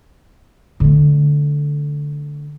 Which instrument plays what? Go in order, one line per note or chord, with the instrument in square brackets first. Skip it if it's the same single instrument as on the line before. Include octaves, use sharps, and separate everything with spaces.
[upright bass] D3 A3